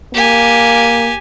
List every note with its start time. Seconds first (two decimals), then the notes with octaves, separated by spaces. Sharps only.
0.14 A#3 G4 G#5